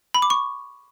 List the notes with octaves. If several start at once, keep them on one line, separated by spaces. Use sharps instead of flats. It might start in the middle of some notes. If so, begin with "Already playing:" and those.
B5
D6
C#6